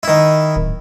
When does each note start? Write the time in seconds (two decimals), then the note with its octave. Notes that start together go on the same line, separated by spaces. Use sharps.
0.03 D#3 E4
0.56 D1